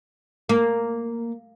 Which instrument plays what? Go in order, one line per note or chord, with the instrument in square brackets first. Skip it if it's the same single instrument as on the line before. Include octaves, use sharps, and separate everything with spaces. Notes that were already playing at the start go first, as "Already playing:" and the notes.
[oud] A#3